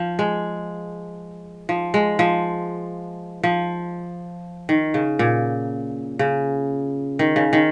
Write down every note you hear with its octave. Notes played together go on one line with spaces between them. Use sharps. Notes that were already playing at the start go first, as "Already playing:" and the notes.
Already playing: F3
G#3
F3
G#3
F3
F3
D#3
C#3
A#2
C#3
D#3
C#3
D#3